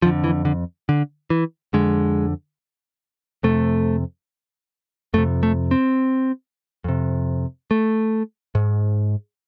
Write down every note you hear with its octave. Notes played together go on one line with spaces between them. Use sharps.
F2 D3 F3
E3
D3
D3
E3
F2 D3 G#3
F2 C3 A3
F2 C3 A3
A3
C4
F2 C3
A3
G#2